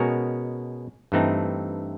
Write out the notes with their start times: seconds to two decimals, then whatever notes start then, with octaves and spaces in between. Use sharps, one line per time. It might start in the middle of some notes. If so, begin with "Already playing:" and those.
Already playing: B2 G#3 C#4 F#4 A#4
1.12 G2 E3 A3 C4 D#4